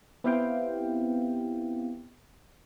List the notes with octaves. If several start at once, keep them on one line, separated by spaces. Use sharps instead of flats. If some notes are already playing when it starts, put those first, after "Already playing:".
B3 C4 E4 G4 F5 G5